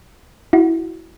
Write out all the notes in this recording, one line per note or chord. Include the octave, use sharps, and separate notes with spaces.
E4 F#4